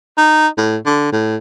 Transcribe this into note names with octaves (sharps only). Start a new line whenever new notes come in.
D#4
A2
D3
A2